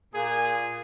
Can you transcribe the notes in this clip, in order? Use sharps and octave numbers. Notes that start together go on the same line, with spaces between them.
A#2 G#4